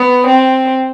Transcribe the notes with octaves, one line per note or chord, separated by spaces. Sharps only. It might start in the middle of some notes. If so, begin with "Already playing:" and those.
Already playing: B3
C4